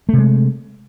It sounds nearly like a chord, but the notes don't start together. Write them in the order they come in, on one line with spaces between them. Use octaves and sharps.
A3 C3 G#3